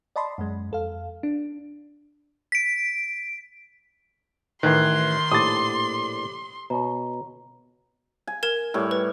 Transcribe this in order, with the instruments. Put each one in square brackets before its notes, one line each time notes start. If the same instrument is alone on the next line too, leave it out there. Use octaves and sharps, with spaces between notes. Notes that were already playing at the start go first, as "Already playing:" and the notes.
[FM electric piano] D5 D#5 A5 B5 C6
F#2 G#3
F2 A4 F5
D4
[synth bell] B6 D7
[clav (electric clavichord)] A1 E3 [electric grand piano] D#3 [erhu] C6 [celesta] F#6 G#6 C7
[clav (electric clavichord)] A#1 A2 [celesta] G4 D6 [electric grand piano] D#6 A6
[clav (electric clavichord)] B2 C#5 [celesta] A#5
[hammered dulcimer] G#5
[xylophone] A#4 G#6 E7
[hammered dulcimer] A2 G3 C#5
[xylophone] B4